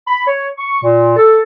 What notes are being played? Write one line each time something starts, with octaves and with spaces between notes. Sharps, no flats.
B5
C#5
C#6
A#2
A4